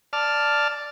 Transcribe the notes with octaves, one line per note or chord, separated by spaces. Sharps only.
D5 A5 F6